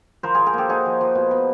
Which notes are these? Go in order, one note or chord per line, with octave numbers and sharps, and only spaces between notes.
F3 A#4 C5
F3 G#4 A#4
G#4 A#4
A#3 G4 A4
D#4 F#4 G#4
F3
F3
B2
B2